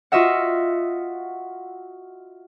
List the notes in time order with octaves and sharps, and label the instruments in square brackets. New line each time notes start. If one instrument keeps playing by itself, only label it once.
[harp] F4 F#4 D#5 E5 F#5